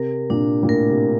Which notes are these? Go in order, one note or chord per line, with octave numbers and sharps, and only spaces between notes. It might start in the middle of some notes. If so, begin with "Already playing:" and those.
Already playing: C3 A#4
A#2 D4
A#2
A2 A#4
C3